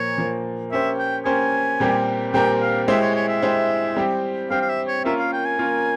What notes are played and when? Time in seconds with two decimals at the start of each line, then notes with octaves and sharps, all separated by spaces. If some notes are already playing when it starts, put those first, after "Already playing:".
Already playing: A#2 F3 A#3 C#5
0.17 A#2 F3 A#3
0.71 A#3 C#4 G4 C5 E5
0.98 G5
1.25 A#3 C#4 G4 C5 G#5
1.80 A#2 G3 C4 G4 A#4
2.33 A#2 G3 C4 G4 A#4 G5
2.62 F5
2.88 G#3 E4 G4 C5 E5
3.01 C#5
3.15 C#5
3.28 E5
3.42 G#3 E4 G4 C5
3.96 G3 C4 G4
4.50 G3 C4 G4 F5
4.62 F5
4.69 E5
4.87 C#5
5.04 A#3 C#4 F4 A#4 E5
5.19 F5
5.33 G5
5.45 G#5
5.59 A#3 C#4 F4 A#4